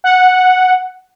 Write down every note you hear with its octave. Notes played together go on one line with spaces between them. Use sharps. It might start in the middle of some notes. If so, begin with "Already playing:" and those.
F#5